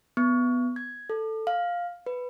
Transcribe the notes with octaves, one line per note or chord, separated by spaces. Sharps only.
B3
G#6
A4
F5
B4